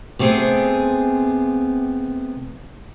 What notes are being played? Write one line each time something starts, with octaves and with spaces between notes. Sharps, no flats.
C3 A3 B3 C4 G#4